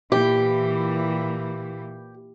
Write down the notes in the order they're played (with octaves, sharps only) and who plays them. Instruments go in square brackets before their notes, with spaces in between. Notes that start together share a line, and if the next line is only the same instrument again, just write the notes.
[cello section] A#2 E3 [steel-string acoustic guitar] G4